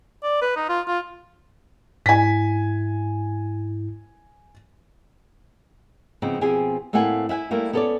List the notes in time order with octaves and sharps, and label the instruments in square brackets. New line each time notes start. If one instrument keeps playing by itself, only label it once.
[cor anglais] D5
B4
D#4
F4
F4
[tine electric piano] G#2 E4 [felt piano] G#5 B6
[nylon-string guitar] C#3 F3 B3 C4 D#4
B2 F3 C4 G4 G#4 G#5
A2 A3 A#3 C4 F#5 G#5
E4 E5 F#5 G#5
G3 A3 A#3 E4
B3 C#4 A4 A#4 C#5 D5